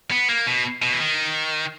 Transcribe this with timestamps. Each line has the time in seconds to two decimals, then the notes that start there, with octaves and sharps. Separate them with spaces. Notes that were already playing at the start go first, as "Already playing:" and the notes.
0.11 B3
0.29 A#3
0.47 B2
0.82 B2
0.92 E3
1.00 D#3